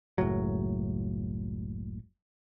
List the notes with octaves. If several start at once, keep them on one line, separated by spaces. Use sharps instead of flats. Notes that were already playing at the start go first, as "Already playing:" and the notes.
F#1 C#2 A2 F#3